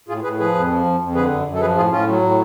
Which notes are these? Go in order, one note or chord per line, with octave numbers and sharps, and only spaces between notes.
A2 F4 G#4
A2 G#4 B4
F3 G#4 B4
F2
F3
F2
F2
D3 G#4 B4
F#2
F#2
A4
F3 G#4 B4
A2 F4 G#4
A2 C#4 F4
F#3
A2